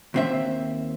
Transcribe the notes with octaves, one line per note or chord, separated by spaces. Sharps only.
D#2 C4 E5